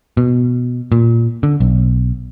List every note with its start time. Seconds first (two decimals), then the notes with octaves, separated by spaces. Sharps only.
0.17 B2
0.92 A#2
1.43 D3
1.60 B1